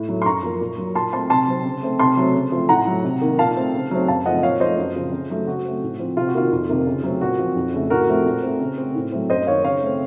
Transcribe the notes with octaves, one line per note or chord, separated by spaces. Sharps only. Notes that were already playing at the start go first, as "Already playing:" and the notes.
Already playing: A2
F#3 A3
C6
F#2 A#5 C#6
F3 A#3
A#2
F#3 A#3
A#2 A5 C6
A3 C4 A5 C6
C3 A5 C6
F#3 C4
C#3
A3 C4
C3 A5 C6
F#3 A3 C4
C#3
F3 A3 C4
A2 F#5 A#5
F#3 A3
C3
D#3 A#3
A#2 F5 A5
A3 C4
C#3
F#3 A3 C4
F#2 F5 A5
C#3 F3 A3 C4 D#5 F#5
A#2 C#5 F5
F3 A3 C5 D#5
F#2
C#3 F3 C4
C#3
F#3 A3
C#3 F#4
A3 C4
A2
F3 C4
C3 F4
F#4
D#3 A#3 F4
F2
C3 D#3 A#3
C#3
F#3 A3 C4
A#2 F#4
F3 C4
F2
C#3 A3
A2 F#4 A#4
F3 A3 C4
A#2
A3 C4
C#3
A3 C4
A2
F#3 A3 C4
F#2 C5 D#5
D#3 A#3 C#5 F5
C#3 C#5 F5
A3 C4